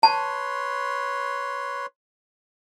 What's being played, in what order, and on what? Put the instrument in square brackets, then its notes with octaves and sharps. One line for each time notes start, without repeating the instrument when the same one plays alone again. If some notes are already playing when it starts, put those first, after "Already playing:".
[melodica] B4 C#5 C6 [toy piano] A5